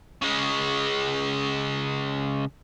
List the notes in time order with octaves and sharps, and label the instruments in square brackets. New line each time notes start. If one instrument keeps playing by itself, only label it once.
[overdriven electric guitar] C#3 G#3